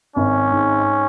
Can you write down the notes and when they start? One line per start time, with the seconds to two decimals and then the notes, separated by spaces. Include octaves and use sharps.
0.16 G#1 C#4
0.52 G#2